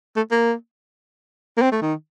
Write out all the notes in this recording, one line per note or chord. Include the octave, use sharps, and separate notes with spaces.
A3
A#3
A#3
C4
A3
D#3